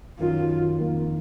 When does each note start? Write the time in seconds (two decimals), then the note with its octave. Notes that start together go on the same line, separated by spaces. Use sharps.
0.19 F#2 D#3 F#3 F4
0.77 F2 D#3 A#3